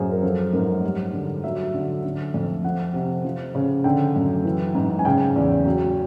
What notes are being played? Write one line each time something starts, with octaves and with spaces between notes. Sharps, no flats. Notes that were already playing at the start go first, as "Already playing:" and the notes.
Already playing: F#2 G#4 C5
A#4
F3 A4
G#2 A#4
G3
D3
F#3 E5
D3
D3
F2
F3 F#5
C3
F3
C#3
D3 G5
F#2
E3
G#2
G#5
C#3 G5
E2
F#3